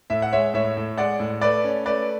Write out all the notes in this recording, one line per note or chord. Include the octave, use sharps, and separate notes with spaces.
A2 E5
F#5
G#3 C#5 E5
A2 C#5 E5
A2
G#3 D5 F#5
A2
A3 B4 D5
C#4
A3 B4 D5